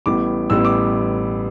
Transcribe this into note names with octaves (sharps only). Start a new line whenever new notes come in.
A1 A2 G3 B3 D6
A1 A2 G3 B3 E6
D6